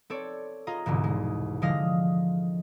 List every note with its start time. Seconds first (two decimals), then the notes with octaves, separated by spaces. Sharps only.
0.10 C4 A4 C#5 D5
0.67 F4 G#4 D#5 A#5
0.86 E1 C2 G#2 D3
1.04 G#3
1.62 D3 F3 G#3 D#5 F5 A#6